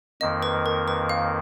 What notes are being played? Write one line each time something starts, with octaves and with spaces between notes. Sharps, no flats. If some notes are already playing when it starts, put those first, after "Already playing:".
F2 D#3 A#3 D#5
B4
A#4
B4
F5